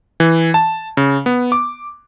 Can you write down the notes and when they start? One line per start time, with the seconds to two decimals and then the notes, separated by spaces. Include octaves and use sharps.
0.20 E3
0.54 A5
0.97 C#3
1.26 B3
1.52 D6